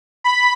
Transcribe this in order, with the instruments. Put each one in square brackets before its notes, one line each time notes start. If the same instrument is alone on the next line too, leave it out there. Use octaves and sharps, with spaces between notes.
[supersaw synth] B5